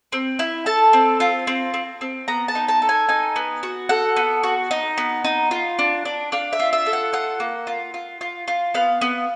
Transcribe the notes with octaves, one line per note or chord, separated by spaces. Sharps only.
C4
E4
A4 A5
C4
F4
C4
C4
C4
B3 A#5
A5
D#4
A5
A4
G#5
D#4 G#5
B3
F#4
A4 F#5
B3
F#4
D#4
B3
D#4
F4
D4
D4
D4 F5
E5
F4
E5
A4
F#5
F4 F#5
A#3
F4
F4
F4
F4
B3 F5
B3